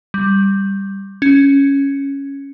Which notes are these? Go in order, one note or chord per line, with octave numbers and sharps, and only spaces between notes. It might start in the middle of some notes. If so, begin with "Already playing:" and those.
G3
C#4